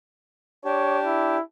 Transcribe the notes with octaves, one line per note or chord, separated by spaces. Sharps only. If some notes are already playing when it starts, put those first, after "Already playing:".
D4 G4 C#5
E4